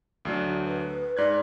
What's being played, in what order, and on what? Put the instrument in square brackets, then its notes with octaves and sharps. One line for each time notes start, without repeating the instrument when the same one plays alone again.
[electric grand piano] D2 F#3 D4
[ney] B4
[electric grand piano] G#2 F#6 G#6 [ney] D5